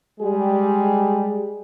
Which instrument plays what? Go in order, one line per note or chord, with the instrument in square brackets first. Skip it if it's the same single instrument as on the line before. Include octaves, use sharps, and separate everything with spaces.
[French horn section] G3 G#3 G4 G#4